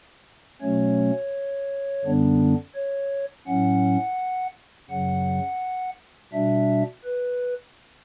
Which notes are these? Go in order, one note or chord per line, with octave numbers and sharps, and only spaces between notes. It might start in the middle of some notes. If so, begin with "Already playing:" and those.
B2 F#3 A3 C#4 C#5
F#2 D3 G3 B3 D4
C#5
A2 F#3 C#4 F#5
F#2 C#3 F#3 F#5
B2 G3 D4 E5
B4